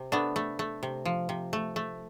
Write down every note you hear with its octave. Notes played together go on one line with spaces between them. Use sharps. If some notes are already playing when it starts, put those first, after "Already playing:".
Already playing: C3
A3 B3 D4
A3
A3
C3
F3
C3
A3
A3